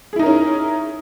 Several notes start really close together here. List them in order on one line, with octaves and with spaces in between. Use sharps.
G#4 E4 D#4 A#4 C#4